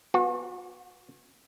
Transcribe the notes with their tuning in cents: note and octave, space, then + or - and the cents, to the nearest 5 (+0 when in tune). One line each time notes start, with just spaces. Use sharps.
B3 +0 F#4 -40